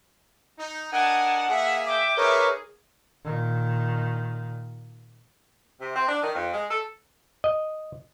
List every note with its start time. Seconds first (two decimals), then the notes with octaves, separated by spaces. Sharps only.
0.58 D#4
0.92 D4 A#4 D#5 F#5 G#5 A5
1.49 A#3 G#4 E5
1.86 E5 G5 D6
2.18 D#4 G#4 A#4 B4 C#5 E5
3.25 A#2 D#3
5.81 C3
5.95 C4
6.08 D4
6.22 D#3
6.35 F2
6.53 G#3
6.71 A4
7.44 D#5